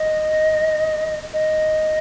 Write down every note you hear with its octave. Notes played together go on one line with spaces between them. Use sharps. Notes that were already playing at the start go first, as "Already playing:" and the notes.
Already playing: D#5
D#5